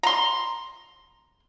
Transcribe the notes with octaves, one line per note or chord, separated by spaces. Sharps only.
A#5 C6